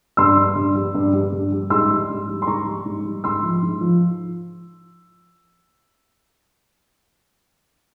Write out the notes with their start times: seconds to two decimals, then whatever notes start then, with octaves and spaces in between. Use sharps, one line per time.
0.17 G2 C6 E6
0.37 G3
0.56 G2
0.75 G3
0.95 G2
1.13 G3
1.32 G2
1.52 G3
1.70 G#2 C6 E6
1.91 G3
2.10 G#2
2.29 G3
2.42 C6
2.47 G#2 A#5 C#6
2.66 G3
2.85 G#2
3.05 G3
3.24 G#2 C6 E6
3.43 F3
3.62 G#2
3.81 F3